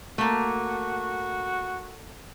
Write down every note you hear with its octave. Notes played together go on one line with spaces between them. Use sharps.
A3 A#3 F#4